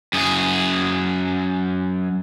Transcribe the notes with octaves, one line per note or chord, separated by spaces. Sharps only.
F#2 G#4